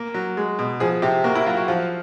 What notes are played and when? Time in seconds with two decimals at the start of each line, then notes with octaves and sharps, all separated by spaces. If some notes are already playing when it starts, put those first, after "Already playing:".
Already playing: A#3
0.14 F#3
0.37 G#3
0.59 B2
0.80 F3 G#4
1.02 C3 G4
1.24 A#3 F#4
1.35 E4
1.46 F#3 F4
1.57 F#4
1.68 F3 F4